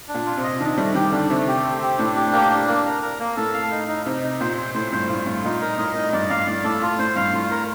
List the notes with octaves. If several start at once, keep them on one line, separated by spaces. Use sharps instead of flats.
D4
A#2
F4
C3
D#5
D#3 D4
G3 A3
D#3 G4
D3 D4
C3 A3
G4
C4
G4
A2 D4
G4
A#3
D4
A#3
A#4
A#4
A#3
A2 A4
F5
D#4
D#4
C3 D#4
D#4
A#2 C5
C5
A2 C5
G2 C5
A2 F4
G2 F4
A#2 D#4
A#4
A2 D#5
D#4
G2 D5
G2 F5
A2 D5
A2 A4
F4
A2 C5
G2 F5
A2 F4
A#4